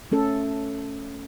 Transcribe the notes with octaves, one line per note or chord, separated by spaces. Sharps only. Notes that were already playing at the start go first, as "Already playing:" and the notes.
A3 C#4 A4